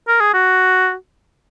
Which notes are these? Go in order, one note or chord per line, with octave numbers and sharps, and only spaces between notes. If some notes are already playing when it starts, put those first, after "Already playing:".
A#4
G#4
F#4